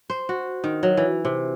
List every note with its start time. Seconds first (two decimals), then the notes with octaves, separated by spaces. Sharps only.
0.10 C5
0.29 F#4
0.64 D#3
0.83 F#3
0.97 E3
1.25 C3